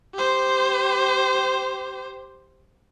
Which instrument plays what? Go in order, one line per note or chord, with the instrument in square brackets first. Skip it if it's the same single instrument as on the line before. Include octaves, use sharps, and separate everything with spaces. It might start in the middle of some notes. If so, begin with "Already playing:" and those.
[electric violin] G4 C5